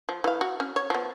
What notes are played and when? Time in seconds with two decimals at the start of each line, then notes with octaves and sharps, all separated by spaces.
0.09 F3
0.24 E3 F5
0.41 F#4
0.60 C#4
0.76 C#5
0.90 F3 B3